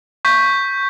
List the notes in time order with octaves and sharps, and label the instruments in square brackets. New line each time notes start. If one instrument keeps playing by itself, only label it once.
[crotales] C#6 G6 B6